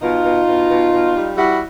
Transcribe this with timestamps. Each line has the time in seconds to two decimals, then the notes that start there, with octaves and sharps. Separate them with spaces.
0.02 B2 D#4 F4
0.25 B2
0.47 B2
0.70 B2
0.93 B2
1.15 G3
1.38 G3 E4 F#4